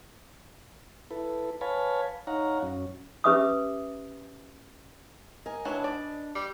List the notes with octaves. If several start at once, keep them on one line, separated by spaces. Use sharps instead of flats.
E4 A4 B4
B4 C#5 F5 G#5 A5 B5
D#4 C#5 F5 F#5 A#5
F#2 C#4
C#4 G4 B4 E5 D6 D#6
A#4 D#5 G#5
E3 F#3 D4 B4 A5
D5
G3